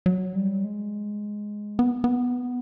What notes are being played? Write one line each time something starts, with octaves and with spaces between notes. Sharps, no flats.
F#3
G3
G#3
B3
B3